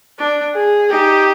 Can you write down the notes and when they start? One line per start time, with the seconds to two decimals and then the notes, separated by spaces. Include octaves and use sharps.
0.18 D4
0.54 G#4
0.90 D#4 G4